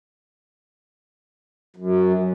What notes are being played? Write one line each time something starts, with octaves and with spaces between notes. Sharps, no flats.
F#2